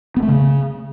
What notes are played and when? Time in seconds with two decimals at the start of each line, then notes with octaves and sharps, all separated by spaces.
0.17 B3
0.22 A3
0.28 C#3